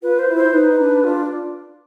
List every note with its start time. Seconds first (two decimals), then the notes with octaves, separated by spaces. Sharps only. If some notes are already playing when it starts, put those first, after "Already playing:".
0.03 F4 B4
0.19 C5
0.28 E4
0.37 C5
0.44 E4
0.53 D#4 B4
0.70 D#4
0.78 D4
1.04 D4 F4